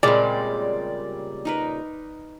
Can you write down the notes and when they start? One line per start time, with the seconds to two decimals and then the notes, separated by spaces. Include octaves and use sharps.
0.03 A#2 C#3 G3 G#3 C4 D5
1.45 D#4 A#4 B4